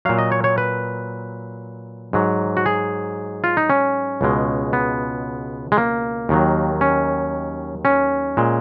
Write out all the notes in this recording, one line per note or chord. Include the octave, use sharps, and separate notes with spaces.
A#2 F#3 F5
D#5
C#5
C#5
B4
G#2 F#3
F#4
G#4
F4
D#4
C#4
C#2 B2 G#3
B3
G#3
A#3
D#2 D#3 F#3
C#4
C#4
A#2 G#3